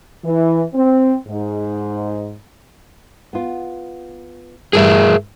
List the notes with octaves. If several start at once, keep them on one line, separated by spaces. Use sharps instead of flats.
E3
C4
G#2
B3 F4
G2 E3 G3 G#4 A#4 E5